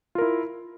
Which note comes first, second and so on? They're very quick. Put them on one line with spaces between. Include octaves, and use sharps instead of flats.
F4 A#4 E4